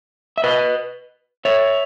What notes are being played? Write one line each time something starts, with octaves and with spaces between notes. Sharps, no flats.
E5
B4 D#5
C#5 E5